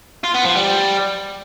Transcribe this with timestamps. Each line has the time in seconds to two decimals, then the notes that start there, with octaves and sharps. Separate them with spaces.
0.24 F4
0.35 B3
0.46 F3
0.56 G3